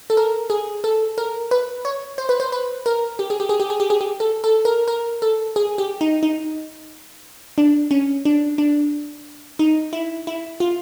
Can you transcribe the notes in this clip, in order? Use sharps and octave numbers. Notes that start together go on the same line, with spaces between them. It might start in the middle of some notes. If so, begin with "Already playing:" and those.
A4
A#4
G#4
A4
A#4
B4
C#5
C5
B4
C5
B4
A#4
G4
G#4
G4
G#4
G4
G#4
G4
G#4
G4
A4
A4
A#4
A#4
A4
G#4
G4
D#4
D#4
D4
C#4
D4
D4
D#4
E4
E4
F4